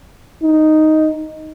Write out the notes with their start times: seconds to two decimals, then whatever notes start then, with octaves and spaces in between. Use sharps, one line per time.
0.43 D#4